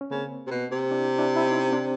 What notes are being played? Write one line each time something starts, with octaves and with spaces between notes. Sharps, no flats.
C#4
C#3 A#3 C4
C3
B2
C3
D4 E4
D4 E4
E4
C#4 D#4
C4 D4